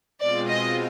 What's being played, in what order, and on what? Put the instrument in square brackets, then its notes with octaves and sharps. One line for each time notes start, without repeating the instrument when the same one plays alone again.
[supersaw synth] B2 G#3 C4 F4 [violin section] D5
[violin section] D#5